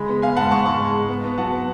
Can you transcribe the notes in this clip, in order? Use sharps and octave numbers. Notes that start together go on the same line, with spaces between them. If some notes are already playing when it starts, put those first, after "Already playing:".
Already playing: C#3 G#3 B5
B3
B3 F5 G#5
G#2 F#5 A5
G#2 A5 C#6
G#2 A5 C#6
G#3
G#3
B3
B3
F#3 F#5 A5
B3